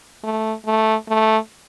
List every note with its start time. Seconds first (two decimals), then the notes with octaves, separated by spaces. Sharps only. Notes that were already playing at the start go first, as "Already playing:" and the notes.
0.24 A3
0.66 A3
1.08 A3